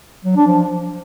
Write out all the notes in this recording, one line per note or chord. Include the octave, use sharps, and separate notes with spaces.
F#3
D4
F3